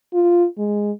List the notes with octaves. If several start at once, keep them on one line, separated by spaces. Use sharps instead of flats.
F4
G#3